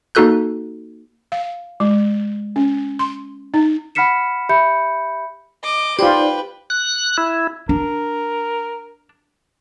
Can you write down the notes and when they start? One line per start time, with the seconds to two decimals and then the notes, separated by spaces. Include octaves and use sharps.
0.15 A#3 D#4 F#4 A4 F#6 G6
1.32 F5
1.80 G#3
2.56 C#4
2.99 C6
3.54 D#4
3.95 F#5 B5 F6 B6 C#7 E7
4.49 G4 E5 B5 G6 C#7
5.64 D#5 D6
5.99 D#4 F4 G4 B4 C5 D5 G5
6.70 F#6
7.18 E4
7.69 D4 A#4